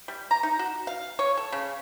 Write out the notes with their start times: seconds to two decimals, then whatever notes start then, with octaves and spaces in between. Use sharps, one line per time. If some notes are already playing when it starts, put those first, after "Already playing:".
0.08 G3
0.31 A#5
0.43 D#4
0.59 F#4
0.87 F5
1.19 C#5
1.37 A4
1.52 C#3